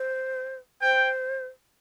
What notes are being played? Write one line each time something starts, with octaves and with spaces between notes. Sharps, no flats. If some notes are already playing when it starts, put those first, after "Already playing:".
Already playing: C5
C5 G5